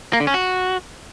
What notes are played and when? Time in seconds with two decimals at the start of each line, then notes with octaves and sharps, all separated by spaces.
0.13 A#3
0.20 D3
0.27 C#4
0.34 F#4